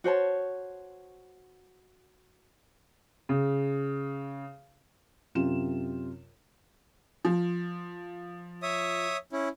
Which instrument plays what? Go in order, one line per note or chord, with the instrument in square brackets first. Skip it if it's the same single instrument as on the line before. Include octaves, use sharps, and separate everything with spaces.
[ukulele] F#4 C5 C#5 A5
[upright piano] C#3
[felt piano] F#2 C3 F4 E7
[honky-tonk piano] F3
[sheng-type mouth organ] C#5 E5 D#6
C#4 E4